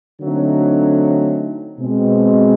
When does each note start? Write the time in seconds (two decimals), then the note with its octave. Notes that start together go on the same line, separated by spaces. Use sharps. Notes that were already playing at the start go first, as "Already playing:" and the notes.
0.20 D3 F#3 A3 C4 D#4
1.79 B2 G#3 C4